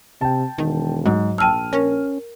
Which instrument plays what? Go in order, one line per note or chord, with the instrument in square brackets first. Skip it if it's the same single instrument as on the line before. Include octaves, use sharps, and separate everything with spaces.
[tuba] C3 [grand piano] G5 A5
[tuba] E1 [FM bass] D#3
[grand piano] G#2 [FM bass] F#3
[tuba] A#1 [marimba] G5 A5 E6 [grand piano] F6 D#7
[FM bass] C#4 [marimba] A#4